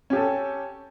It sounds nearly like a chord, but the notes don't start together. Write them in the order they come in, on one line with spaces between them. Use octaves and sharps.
C#4 G4 A4